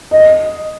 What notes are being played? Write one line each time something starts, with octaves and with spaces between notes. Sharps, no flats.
D#5